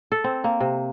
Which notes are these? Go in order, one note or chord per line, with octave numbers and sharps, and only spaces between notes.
A4
C4
A#3
C3